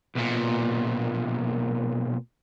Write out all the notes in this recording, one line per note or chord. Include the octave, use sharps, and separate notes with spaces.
B1 A#2